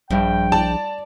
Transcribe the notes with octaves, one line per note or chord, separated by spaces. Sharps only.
A#1 G2 G5
D5 A5